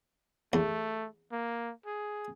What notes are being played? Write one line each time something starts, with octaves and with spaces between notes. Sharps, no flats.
E2 A3
A#3
G#4